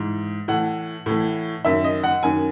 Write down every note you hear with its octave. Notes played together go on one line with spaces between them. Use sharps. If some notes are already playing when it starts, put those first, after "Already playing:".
Already playing: G#2 E3
A2 E3 F#5
A2 E3
F#2 D#3 E5
D#5
F#5
F#2 D#3 G#5